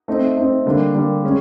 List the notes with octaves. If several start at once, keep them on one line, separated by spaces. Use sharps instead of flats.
A3 C4 D#4
A3 C4 D#4
D3 G3 A#3 D4
D3 G3 A#3 D4
G#3 C#4